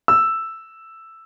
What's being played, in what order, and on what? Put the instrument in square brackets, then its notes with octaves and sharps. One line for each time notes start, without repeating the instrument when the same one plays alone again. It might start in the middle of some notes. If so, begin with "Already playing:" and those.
[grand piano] E6